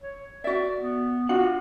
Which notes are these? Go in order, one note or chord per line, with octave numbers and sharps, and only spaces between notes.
C#5
F#4 D5 E5
B3
D4 F4 F#4 F#5